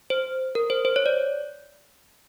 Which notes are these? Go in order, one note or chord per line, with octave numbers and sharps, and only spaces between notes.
C5
A#4
C5
C5
C#5
D5